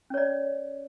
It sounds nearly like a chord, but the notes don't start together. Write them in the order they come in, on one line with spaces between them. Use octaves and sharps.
C#4 C#5 D5